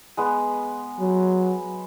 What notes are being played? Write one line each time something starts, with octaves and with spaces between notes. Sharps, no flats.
G#3 B3 B4
F#3